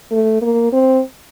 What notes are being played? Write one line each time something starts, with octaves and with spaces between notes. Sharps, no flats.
A3
A#3
C4